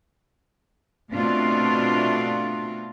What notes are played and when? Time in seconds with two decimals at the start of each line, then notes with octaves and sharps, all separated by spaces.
1.13 B2 A3 C4 D4 F4